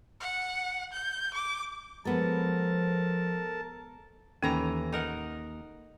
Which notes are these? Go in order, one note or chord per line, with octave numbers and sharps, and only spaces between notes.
F#5
G6
D6
F3 G#3 B3 A4 A#4 A5
D#2 A2 E3 C#4 A#5
D#4 A#4 F#5